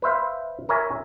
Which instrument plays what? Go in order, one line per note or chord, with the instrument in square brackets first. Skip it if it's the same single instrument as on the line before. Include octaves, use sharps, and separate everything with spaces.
[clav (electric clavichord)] B4 C5 E5 F5
A#4 C#5 E5 G#5